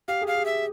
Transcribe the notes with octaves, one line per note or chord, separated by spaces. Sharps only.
G4 F5
G#4
F5
G4
E5